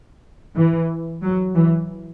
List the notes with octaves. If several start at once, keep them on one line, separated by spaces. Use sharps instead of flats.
E3
F#3
E3